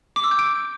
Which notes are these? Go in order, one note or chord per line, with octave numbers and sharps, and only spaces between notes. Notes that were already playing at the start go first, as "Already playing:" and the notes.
D6
E6
G6
D7